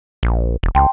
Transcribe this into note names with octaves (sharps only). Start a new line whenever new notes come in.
A#1
E1
C#2 G5 A5 C6